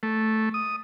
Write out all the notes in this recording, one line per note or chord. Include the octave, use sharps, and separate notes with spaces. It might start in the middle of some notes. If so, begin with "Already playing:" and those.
A3
D#6